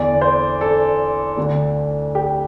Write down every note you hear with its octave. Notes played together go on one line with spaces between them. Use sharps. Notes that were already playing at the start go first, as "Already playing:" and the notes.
Already playing: E2 D3 D5
C5
A4
D2 D3
G4